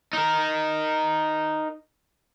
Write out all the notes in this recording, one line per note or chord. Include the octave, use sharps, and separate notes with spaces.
D#4 A#4